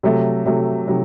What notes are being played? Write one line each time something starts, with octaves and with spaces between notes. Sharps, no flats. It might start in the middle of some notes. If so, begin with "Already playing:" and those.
C3 F#3 A3
C3 F#3 A3
C3 F#3 A3